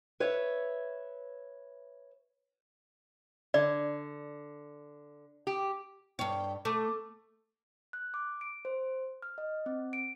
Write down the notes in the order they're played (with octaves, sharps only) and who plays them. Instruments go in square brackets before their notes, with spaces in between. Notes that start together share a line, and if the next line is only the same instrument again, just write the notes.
[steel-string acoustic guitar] B4 C#5 E5
[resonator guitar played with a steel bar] D3 [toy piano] D5
[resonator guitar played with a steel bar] G4
[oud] G2 C#5 [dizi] G5
[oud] A3 [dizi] D6
[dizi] D6
[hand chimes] F#6
D6
D7
C5
F6
D#5
C4
D7